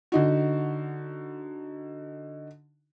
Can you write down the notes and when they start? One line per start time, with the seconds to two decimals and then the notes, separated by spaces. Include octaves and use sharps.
0.12 D3 D#4 F#4